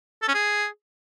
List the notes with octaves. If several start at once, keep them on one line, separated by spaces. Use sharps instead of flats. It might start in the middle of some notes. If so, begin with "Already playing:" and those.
A4
C#4
G#4